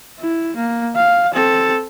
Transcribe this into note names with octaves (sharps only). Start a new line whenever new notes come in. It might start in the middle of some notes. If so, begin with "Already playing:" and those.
E4
A#3
F5
C4 A4